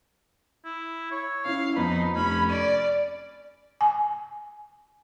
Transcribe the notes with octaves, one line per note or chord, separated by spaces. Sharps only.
E4
C#5
C#4 E4 F5
F2 F3 B3 D#4 B5
F1 C#4 B5
D5 D#7
G#5